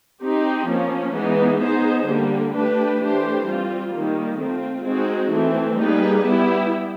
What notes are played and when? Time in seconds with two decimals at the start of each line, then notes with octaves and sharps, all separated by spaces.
0.22 C4 D#4 G4
0.68 F3 A#3 C#4
1.15 E3 G#3 B3 D#4
1.60 B3 D#4 G#4 C5
2.07 D3 G3 A#3
2.54 A3 D4 G4 B4
3.00 E3 A3 D4 G4 C5
3.46 G3 C4 F4
3.93 D#3 G3 A#3
4.39 A3 C4 F4
4.85 G#3 C4 D#4 F#4
5.31 E3 A3 C4
5.78 G3 A#3 D#4 G#4 B4
6.25 G3 B3 E4 G4